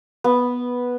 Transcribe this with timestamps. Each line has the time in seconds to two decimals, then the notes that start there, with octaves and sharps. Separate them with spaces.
0.24 B3